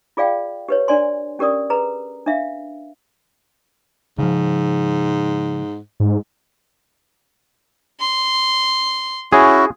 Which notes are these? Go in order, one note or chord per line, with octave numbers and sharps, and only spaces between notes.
F4 G#4 D5 F5 G5
G4 B4 C#5
D4 D5 G#5 C6
C#4 G4 A#4 D5 D#6
G#4 B4 A#5
D4 E5 F5
G#2 C#3 F3
G#2
C6
C#4 E4 F#4 G#4